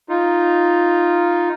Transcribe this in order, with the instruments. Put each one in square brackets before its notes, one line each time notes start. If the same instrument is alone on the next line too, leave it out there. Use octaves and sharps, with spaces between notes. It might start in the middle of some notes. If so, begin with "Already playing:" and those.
[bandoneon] D#4 F4